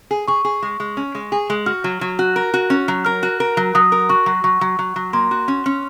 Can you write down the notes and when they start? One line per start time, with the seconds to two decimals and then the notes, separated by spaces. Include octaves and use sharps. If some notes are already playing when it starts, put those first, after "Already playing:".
0.11 G#4
0.28 G#4 C#6
0.45 G#4
0.63 G#3
0.80 G#3
0.97 C#4
1.15 G#3
1.32 G#4
1.50 G#3
1.66 F#4 F6
1.84 F#3
2.01 F#3
2.19 F#4
2.36 A#4
2.54 F#4
2.70 C#4
2.88 F#3
3.05 A#4 F6
3.23 F#4
3.40 A#4
3.57 F#3
3.75 F#3 D#6
3.92 A#4
4.09 F#4 C#6
4.26 F#3
4.44 F#3 C#6
4.61 F#3
4.79 F#3
4.96 F#3
5.13 A#3 C6
5.31 F#4
5.48 C#4
5.66 C#4